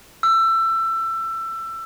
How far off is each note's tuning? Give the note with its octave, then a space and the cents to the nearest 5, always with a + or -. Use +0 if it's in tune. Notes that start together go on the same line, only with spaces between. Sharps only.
E6 +20